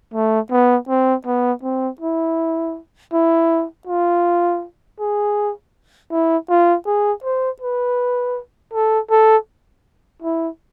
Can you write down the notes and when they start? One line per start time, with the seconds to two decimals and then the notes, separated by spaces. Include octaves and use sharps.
0.14 A3
0.51 B3
0.88 C4
1.26 B3
1.63 C4
2.01 E4
3.13 E4
3.87 F4
5.00 G#4
6.11 E4
6.50 F4
6.86 G#4
7.24 C5
7.62 B4
8.73 A4
9.11 A4
10.22 E4